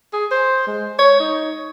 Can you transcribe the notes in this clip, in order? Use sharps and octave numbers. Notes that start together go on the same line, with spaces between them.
G#4
C5
G#3
C#5
D#4